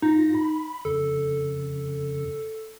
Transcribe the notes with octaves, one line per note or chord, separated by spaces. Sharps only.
G#2 D#4 F4 A#6
B5
F2 C#3 A4